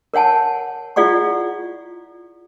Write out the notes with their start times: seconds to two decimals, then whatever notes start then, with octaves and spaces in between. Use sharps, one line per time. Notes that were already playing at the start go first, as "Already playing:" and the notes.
0.14 A#4 C#5 F#5 G#5 A5
0.96 E4 F4 G#4 D5 F#5 C#6